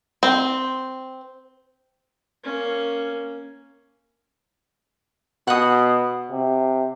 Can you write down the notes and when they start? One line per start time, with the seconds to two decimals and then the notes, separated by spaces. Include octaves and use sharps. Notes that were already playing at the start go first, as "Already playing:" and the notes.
0.23 C4
2.44 A#3 C#4
5.47 B2 F#5 D#6
6.30 C3